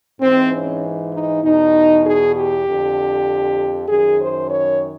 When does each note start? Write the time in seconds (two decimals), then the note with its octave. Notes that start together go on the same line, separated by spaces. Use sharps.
0.20 G#2 E3 C4
0.51 C#4
1.12 D#4
1.43 E2 B2 D#4
2.05 G#4
2.35 G4
2.66 F2 D3
3.88 F#2 D#3 G#4
4.19 C5
4.49 C#5